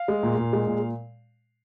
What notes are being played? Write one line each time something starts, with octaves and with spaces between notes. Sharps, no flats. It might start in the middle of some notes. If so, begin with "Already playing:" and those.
Already playing: F5
G#3
A#2
A#2
G#3
A#2